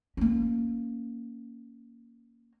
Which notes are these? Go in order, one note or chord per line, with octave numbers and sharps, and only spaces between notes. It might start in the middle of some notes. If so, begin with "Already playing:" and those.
A#3 C#4